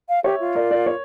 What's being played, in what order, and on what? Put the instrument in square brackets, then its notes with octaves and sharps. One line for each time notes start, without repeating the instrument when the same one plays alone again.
[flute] F5
[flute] G4 [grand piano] C#5 E5
[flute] F4
[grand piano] A#4 D5
A#4 D5
C#5